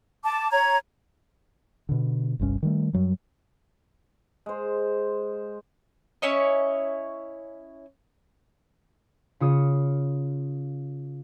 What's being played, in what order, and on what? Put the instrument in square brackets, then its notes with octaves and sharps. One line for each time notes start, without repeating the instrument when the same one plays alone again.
[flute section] A5 D6
C#5 A#5 G#6
[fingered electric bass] B2 D3
G1 C2 G2 C#4
D#3 G3 A3
F#2 F#3 G3
[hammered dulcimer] G#3 C5
[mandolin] C#4 E4 C#5 D#5
[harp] C#3 F4 C#5 D#6